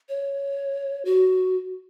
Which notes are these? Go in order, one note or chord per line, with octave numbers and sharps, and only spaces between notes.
C#5
F#4